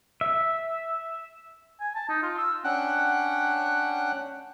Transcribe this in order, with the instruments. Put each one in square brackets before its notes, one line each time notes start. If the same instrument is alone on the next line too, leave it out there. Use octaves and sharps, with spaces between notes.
[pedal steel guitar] E5
[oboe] G#5
A5
D#4
F4
E6
[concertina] C#4 D4 F#5 G5 F#6